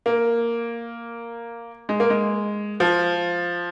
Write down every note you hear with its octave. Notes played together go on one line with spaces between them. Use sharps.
A#3
G#3
A#3
G#3
F3